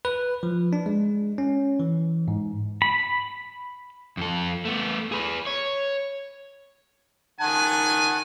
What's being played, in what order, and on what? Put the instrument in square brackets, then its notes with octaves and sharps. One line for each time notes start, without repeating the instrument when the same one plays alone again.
[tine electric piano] B4
F3
D4
G#3
C#4
E3
G#2
[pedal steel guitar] B5
[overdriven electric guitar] F2 A4
A3 B3
G#4 B4
C#5
[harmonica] D#3 F#5 A5 [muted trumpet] G#5